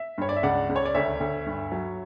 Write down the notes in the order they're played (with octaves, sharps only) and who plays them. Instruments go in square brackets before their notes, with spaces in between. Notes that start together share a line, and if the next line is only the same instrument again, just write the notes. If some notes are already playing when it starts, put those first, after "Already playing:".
Already playing: [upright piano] E5
G2 C#5
D5
E5
C#2 D5 F#5
C#2
C#5
D5
D2 C#5 E5
D2
G2
F#3